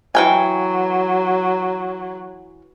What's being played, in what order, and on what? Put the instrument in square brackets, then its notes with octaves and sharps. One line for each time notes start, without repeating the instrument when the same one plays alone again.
[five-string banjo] E3 G5 G#5 [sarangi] F#3